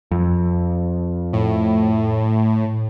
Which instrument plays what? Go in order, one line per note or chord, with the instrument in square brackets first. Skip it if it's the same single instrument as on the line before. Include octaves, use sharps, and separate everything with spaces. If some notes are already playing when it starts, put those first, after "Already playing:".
[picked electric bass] F2
[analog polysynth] A2